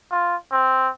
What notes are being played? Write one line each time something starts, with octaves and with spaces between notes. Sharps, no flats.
F4
C4